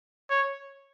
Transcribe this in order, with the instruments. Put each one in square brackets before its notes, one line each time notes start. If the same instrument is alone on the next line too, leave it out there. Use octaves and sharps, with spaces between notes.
[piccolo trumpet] C#5